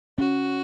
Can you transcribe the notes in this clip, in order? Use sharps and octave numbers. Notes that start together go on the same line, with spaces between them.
C#4 F#4